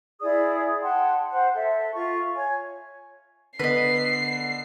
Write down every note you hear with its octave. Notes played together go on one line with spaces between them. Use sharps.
E4 G#4 D5 D#6
F#5 G5 A5 C6
C5 F#5
A4 E5
F4 C#6
C#5 G#5
D3 B3 B4 D#5 C7